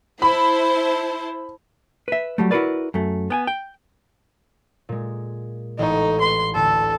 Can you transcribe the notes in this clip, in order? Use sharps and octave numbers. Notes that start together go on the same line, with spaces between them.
E4 C5 A5 B5
B4 E5
F#3 G3 A3
E4 F#4 G#4 A#4 B4 D5
F#2 A3
B3 G5 G#5
G5
A#2 G#3
A1 D#4 C#6
B4 C6
D2 A2 A4